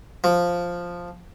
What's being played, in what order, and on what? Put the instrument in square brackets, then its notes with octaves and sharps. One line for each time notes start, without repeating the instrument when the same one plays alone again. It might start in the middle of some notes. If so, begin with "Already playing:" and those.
[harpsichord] F3